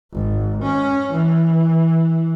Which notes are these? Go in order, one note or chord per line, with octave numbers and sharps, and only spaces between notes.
G#1
C#4
E3